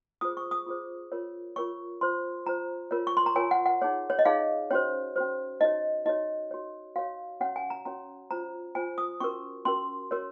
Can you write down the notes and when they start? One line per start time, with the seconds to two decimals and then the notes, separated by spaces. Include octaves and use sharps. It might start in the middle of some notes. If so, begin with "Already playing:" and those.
0.21 F4 G#4 C5 D#6
0.37 C#6
0.51 D#6
0.66 F4 G#4 C5
1.12 F4 A#4 C#5
1.56 F4 A#4 C#5 C#6
2.01 F4 C5 C6
2.46 F4 C5 A#5
2.91 F4 A#4 C#5
3.07 C#6
3.17 C6
3.26 A#5
3.36 F4 A#4 C#5 G#5
3.51 F#5
3.66 F#5
3.82 D#4 G#4 C#5
4.10 C#5
4.19 D#5
4.25 D#4 G#4 C#5 F5
4.71 C#4 F#4 C5 C#5
5.16 C#4 F#4 C5
5.61 D#4 F#4 C#5 D#5
6.06 D#4 F#4 C#5 D#5
6.51 F#4 C#5
6.96 F#4 C#5 F5
7.41 C#4 F#4 C#5 F#5
7.56 G#5
7.70 A#5
7.85 C#4 F#4 C#5 A#5
8.31 F4 C5 A#5
8.75 F4 C5 G#5
8.98 D#6
9.20 C#4 F#4 A#4 C#6
9.65 C#4 F#4 A#4 C6
10.11 F#4 A#4 C#5